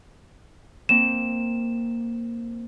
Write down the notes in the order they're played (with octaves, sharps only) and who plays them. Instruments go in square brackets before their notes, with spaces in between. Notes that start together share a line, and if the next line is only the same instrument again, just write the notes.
[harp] A#3 C4 [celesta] E7